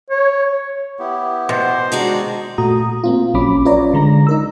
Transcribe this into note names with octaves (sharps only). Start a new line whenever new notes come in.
C#5
B3 E4 G4
B2 C5
D#3 G#3 D4 F#4
A#2 A3 F#4 A#5 D#6
A#3 C4 F4
A#1 F#3 C#4 B5 D6
C#4 F4 B4 C#5 D5 A#5
D3 G#3 A#5 A#6
D#4 A#4 E6